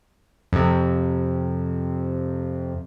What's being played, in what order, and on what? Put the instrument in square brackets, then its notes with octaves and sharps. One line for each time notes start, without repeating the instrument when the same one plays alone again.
[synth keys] F2 C3